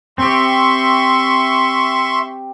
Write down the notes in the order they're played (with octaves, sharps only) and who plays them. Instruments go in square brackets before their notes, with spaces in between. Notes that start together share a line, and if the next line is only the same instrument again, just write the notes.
[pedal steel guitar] C4 G4 [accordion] E5 C6 C#6